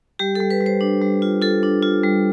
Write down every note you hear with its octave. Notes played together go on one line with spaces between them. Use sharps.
G3 G4
G3 A4
B4
G3
C5
D4
G3
F4
F4 A4
D4
F4
G3